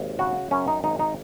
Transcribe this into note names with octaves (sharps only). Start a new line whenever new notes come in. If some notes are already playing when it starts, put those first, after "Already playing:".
Already playing: G#1 D#2
C#3 F#4
F#2 C#4
D#4
G#1 D#4
D#4